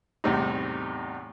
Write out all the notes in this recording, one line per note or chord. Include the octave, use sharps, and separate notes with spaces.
E2 A2 C3 G3 D#4